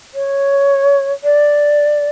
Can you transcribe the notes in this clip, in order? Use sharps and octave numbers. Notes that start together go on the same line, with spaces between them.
C#5
D5